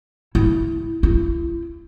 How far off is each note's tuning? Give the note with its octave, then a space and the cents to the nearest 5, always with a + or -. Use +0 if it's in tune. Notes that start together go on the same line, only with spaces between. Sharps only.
E4 +0
E4 +40